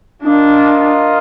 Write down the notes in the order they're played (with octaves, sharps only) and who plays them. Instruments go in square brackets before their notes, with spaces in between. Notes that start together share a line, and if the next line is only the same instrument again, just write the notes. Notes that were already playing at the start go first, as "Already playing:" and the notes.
[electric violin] D4 [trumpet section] F4 A#4 D#5